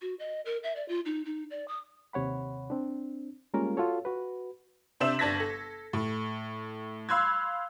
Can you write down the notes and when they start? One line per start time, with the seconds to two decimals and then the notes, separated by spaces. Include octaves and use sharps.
0.01 F#4
0.19 D#5
0.45 A#4
0.63 E5
0.76 D5
0.88 F4
1.05 D#4
1.25 D#4
1.50 D5
1.68 D#6
2.13 D#2 C3 C#5 F#5 B5
2.70 C4 D4
3.54 G3 G#3 A#3 C#4 F4 A#4
3.77 F4 F#4 A4 C#5
4.05 F#4 B4
5.00 C3 D4 C5 E5 E7
5.19 G1 D4 A5 G#6 A#6 B6
5.40 A4
5.93 A2
7.09 F5 B5 C6 E6 F#6 G#6